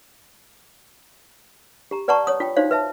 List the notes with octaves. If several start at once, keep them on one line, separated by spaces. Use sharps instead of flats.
G4 A#5
B4 D5 F#5 A5 A#5 C#6
C#5 D#6
F4 G5
D#4 F#4 C5 C#5 F5
B4 E5 A5